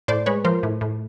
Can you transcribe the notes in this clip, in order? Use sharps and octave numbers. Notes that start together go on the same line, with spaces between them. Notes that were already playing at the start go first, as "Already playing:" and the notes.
A2 C5 D5
G#3 B4 C#5
F3 A#4 C5
A2
A2